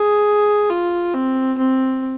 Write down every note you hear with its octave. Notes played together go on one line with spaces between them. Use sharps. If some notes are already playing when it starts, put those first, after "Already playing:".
Already playing: G#4
F4
C4
C4